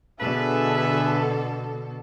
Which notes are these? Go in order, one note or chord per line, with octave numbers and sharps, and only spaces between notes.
B2 D3 G#4 A4 B4 E5